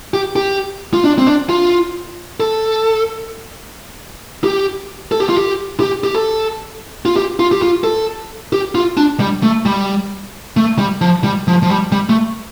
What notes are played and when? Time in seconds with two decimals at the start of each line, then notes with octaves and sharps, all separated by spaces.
0.14 G4
0.36 G4
0.94 F4
1.04 D4
1.18 C4
1.27 D4
1.50 F4
2.40 A4
4.44 G4
5.12 A4
5.20 G4
5.29 F4
5.37 G4
5.80 G4
6.04 G4
6.15 A4
7.05 F4
7.16 G4
7.40 F4
7.52 G4
7.62 F4
7.84 A4
8.53 G4
8.75 F4
8.97 D4
9.20 G3
9.43 A3
9.66 G3
10.57 A3
10.79 G3
11.01 F3
11.24 G3
11.48 F3
11.63 F3
11.70 G3
11.92 G3
12.09 A3